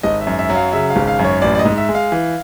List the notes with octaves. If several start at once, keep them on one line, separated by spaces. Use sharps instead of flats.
G#1 D#5
E5
F#2
E5
F#3
F5
C#3 E5
F5
G#1
F5
F#2
C#5
A1 D5
D5
D#5
G#2
E5
G#3
F5
E3